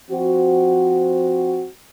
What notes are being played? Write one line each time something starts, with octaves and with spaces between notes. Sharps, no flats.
F3 C4 F#4